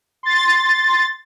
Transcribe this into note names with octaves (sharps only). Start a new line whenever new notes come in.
C6 A6